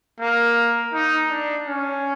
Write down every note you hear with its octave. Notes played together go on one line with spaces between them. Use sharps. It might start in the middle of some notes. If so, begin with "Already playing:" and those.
A#3
D#4
D4
C#4